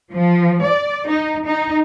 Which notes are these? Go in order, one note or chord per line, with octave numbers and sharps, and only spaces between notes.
F3
D5
D#4
D#4